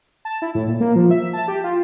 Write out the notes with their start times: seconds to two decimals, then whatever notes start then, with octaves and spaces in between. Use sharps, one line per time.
0.25 A5
0.42 E4
0.55 A2
0.68 A#2
0.80 A#3
0.96 F3
1.11 E5
1.33 A5
1.48 G4
1.64 F4